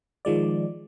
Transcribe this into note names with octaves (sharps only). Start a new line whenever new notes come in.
D#3 F3 G#3 D5